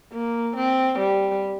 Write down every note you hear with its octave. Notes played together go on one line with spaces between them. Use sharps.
A#3
C4
G3